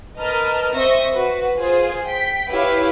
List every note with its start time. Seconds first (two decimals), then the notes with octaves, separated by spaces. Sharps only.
0.18 A#4 B4 D#5 A5 F6
0.75 C4 D#5 E5 C#6 A#6
1.12 F#4 B4
1.57 F4 G#4 C5
2.07 G5 B6
2.51 E4 G4 B4 C#5 F5